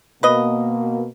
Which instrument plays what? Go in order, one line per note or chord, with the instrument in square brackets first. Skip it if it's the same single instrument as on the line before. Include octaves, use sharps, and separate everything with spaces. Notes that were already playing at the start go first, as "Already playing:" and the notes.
[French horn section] B2 A#3 [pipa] B4 D#5